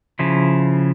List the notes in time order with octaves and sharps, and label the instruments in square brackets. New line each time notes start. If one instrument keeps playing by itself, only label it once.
[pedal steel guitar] C#3 F3 E4